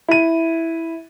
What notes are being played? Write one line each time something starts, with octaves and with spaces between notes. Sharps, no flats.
E4 D#7